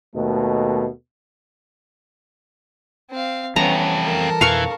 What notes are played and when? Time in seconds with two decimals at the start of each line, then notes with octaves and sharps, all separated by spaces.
0.15 D#2 B2 A3
3.11 C4 F5
3.56 F2 E3 G3 A3 B3 C#4 A#5
4.01 A4 A#4
4.41 F2 B2 E3 F5 C#6